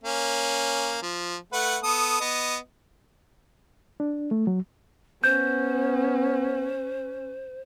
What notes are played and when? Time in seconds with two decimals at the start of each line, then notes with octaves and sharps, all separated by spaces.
0.04 A#3 C#4
1.03 F3
1.53 A3 B4 F#5
1.83 B3 A4 D#6
2.21 B3 D#5
4.00 D4
4.31 A3
4.47 F#3
5.24 B3 C#4 C5 G6